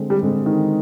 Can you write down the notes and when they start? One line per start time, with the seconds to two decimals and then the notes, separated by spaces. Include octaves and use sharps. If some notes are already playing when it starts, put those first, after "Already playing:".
Already playing: D3 G#3 C4
0.10 G3
0.23 D3 G#3 C4
0.46 D#3